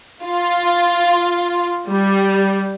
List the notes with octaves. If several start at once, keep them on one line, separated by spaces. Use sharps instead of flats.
F4
G3